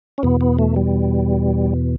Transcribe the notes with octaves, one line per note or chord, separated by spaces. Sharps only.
C#4
E2 B2 B3
B3
A3
G3